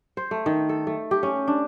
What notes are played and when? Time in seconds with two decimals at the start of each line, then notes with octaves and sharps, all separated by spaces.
0.17 C5
0.31 A3
0.46 D#3
0.69 A4
0.87 A3
1.11 G4
1.23 C#4
1.48 D4